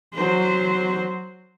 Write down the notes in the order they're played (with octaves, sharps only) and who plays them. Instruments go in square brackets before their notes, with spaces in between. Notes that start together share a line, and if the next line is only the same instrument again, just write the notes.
[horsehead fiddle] F#3 C5